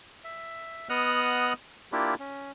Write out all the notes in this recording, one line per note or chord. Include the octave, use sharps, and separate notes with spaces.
E5
B3 D#5 F#5 D#6 F6 F#6
A#3 D4 E4 F4 G4
C#4